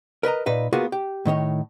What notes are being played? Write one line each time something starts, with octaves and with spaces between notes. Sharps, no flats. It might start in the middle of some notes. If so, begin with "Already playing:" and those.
A#4 B4 D#5 A#5
A#2 D#4 B4 E5
A#3 B3 F4 F#4 G#4 A#4
G4
A2 D#3 D#4 C#5